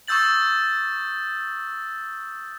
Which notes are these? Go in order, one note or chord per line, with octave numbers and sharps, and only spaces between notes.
C#6 D#6 E6 G6 A6 F#7